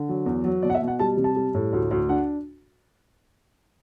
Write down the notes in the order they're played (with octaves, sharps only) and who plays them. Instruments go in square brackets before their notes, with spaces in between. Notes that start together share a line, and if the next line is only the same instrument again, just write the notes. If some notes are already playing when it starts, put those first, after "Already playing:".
Already playing: [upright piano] D3
F#3
E2
F#3
B2 D5
F#5
E5
B2
F#5
G3 A5
C3
A5
G3
A2
D2
D2
D4 F#5